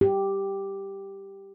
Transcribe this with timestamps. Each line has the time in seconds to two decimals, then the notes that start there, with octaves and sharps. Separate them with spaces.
0.01 G4